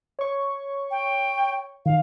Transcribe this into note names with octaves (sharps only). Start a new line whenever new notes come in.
C#5 C#6
G5
D#3 F5